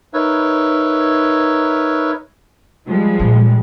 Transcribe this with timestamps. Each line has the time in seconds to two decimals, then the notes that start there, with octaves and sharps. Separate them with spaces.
0.13 D#4 A#4 B4 C#5 E5
2.87 F3 G3 G#3
3.20 A#2